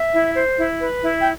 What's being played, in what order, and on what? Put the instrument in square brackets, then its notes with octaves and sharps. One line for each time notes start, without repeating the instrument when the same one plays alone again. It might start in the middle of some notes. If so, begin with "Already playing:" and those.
Already playing: [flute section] E5
E4
C5
E4
B4
E4
G5